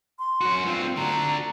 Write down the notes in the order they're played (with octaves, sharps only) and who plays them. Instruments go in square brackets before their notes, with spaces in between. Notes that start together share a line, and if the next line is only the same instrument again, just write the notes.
[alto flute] C6
[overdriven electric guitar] F#2 F#4
[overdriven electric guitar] G2 C4 [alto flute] F4
[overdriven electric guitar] D3 F#4 [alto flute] A#5